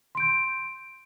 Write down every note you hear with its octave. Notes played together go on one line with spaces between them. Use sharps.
C6 G6 D7